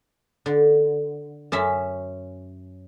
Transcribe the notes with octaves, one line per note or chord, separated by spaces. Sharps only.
D3
F#2 C#4 E5